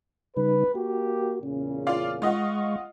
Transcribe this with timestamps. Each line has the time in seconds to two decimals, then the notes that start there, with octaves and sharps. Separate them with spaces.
0.37 C#3 G3 D#4 B4
0.75 A#3 F#4 G4
1.43 E2 A#2 C#3 C#4
1.87 F4 D5 F5
2.22 G#3 F4 D#5 F#5 C#6